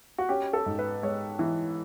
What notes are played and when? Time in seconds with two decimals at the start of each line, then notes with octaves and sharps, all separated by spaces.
0.18 F#4
0.29 C#4 G4
0.53 A4
0.66 G#2
0.79 B4
1.03 G#3 C#5
1.39 E3